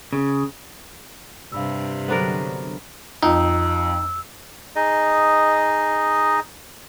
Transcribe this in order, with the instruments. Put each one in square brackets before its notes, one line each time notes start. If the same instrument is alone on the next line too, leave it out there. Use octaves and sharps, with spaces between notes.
[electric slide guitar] C#3
[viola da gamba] G2 C3 [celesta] F5 B5 E6
[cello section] D3 F#3 [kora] B3 D4 A#4 [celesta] A4 C5 A#5
[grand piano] F2 [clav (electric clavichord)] D#4 [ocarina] E6
[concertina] D#4 G#4 D#5